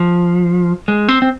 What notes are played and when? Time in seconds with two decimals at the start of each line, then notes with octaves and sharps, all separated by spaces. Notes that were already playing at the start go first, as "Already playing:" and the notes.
Already playing: F3
0.88 G#3
1.08 C4
1.22 C4